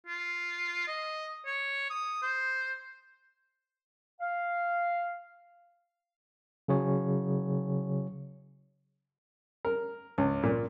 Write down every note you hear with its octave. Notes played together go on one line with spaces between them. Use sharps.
F4
D#5
C#5
D#6
C5
F5
C#3 F#3 G#4 C#5
A#4
C#2
A#2